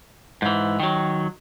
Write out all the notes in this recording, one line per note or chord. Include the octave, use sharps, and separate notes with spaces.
G#2 E3
D#3 F#3